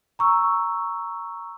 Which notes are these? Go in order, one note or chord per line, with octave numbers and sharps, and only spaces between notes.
A#5 C#6 E6